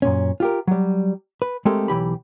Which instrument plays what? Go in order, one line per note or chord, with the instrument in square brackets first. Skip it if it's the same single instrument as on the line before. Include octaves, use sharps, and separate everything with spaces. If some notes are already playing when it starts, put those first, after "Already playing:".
[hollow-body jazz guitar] F#2 A#2 C#4
F4 G4 A#4
F#3 G3
B4
G#3 A3 C4 G4 A4 A#4
B1 E3 G4 B5